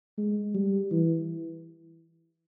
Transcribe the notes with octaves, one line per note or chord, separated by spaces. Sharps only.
G#3
G3
E3